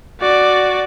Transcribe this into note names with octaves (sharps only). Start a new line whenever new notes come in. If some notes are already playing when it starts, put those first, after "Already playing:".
F#4 D5